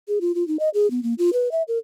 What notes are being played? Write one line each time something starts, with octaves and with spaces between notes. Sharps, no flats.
G#4
F4
F4
D#4
D#5
G#4
B3
A#3
F4
B4
E5
A#4